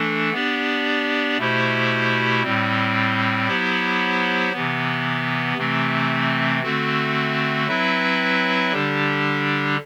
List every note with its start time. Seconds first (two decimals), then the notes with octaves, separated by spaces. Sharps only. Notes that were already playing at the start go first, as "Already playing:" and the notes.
Already playing: E3 A3 D4 A4
0.32 B3 D4 G4 D5
1.38 B2 A3 E4 G4 C5
2.43 A2 G3 C4
3.47 F#3 B3 E4 G4 C5
4.53 C3 E3 B3
5.57 C3 E3 A3 C4
6.62 D3 A3 C4 F#4
7.67 F#3 C4 E4 B4 E5
8.72 D3 G3 D4 G4